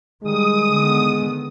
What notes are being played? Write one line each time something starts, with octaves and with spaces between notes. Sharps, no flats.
D#3 G3 G#3 D#6
D3 D#3 B3